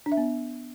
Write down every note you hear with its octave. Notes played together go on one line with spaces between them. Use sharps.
D4
E5
B3